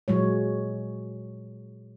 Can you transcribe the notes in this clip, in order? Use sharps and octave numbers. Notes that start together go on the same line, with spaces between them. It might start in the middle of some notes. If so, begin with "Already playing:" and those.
A#2 F#3 G#3 C#5